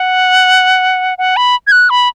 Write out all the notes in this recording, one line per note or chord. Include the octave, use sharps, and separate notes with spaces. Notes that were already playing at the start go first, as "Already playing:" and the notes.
Already playing: F#5
F#5
B5
G#6
F#6
B5